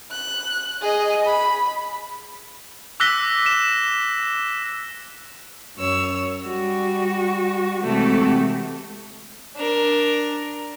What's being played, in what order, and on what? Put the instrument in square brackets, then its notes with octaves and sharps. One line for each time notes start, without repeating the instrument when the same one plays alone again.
[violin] F#6
G#4 D#5
B5
[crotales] D6 E6 F#6 A#6 B6 G7
E7
[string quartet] F#2 C#5 E6
G3 F#4
C3 E3 G#3 A3 F#4 A4
[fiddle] D4 A#4